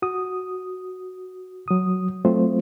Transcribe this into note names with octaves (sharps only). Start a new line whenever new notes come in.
F#4 D#6
F#3 D#6
F#3 A3 C4 F4 C5